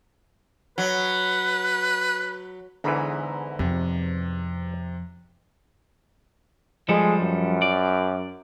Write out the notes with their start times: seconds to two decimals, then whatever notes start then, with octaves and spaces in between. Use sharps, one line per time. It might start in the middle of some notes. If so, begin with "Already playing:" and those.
0.78 F#3 B4
2.84 E2 G#2 D3 E3 A#5 B5
3.59 F2 C3
6.89 F3 G3 G#3 A4
7.22 F#2
7.62 D5